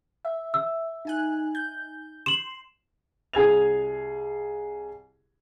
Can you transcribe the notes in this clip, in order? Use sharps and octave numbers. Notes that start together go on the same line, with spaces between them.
E5
E6
D#4 G#5 F#6
G6
C6 E7 F#7
C2 G#4 G#6 F7